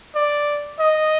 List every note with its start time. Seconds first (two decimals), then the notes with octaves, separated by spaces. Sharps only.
0.15 D5
0.79 D#5